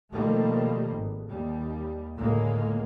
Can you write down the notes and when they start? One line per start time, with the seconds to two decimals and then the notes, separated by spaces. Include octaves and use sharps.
0.13 B2 D#3 F3 G3 A3 A#3
0.93 G#1
1.28 D#2 G3
2.16 C#2 A2 D3 G#3 A#3